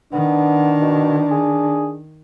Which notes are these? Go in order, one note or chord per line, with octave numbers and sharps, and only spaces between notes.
D#3 B3 D4
B2
G#4